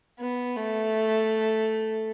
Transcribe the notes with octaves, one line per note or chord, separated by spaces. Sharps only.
B3
A3